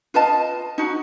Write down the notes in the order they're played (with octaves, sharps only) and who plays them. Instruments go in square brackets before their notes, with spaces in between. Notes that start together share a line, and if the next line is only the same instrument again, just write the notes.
[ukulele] F4 B4 D#5 A5
D#4 F#4